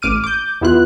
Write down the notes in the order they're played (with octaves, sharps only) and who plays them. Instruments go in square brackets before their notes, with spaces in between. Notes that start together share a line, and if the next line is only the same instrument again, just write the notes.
[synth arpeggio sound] A1 D6 F6 D#7
D6 G6
E2 B3 E4 F4 F#6